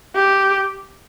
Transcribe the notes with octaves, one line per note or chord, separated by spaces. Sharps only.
G4